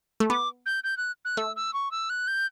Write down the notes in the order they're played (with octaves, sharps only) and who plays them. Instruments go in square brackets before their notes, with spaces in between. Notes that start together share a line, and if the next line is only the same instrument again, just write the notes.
[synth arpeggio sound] A3
[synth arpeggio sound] B3 [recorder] D6
[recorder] G6
G6
F#6
F#6
[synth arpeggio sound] A3 [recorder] E6
[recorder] E6
C#6
E6
F#6
G6